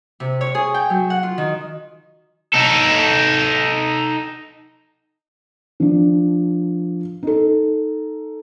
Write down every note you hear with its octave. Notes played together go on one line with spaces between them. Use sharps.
C3
C#5
G#4
G5
F#3
F#5
F4
D#3
D#4 A4
F3 D4
D#4 A4